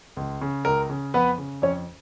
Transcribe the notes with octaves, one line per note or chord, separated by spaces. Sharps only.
C#2
C#3
C#2 A#4
C#3
F2 B3 B4
C#3
F2 C#4 C#5